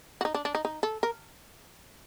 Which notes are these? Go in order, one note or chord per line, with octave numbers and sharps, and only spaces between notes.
F#4
D#4
D4
D4
D#4
D#4
A4
A#4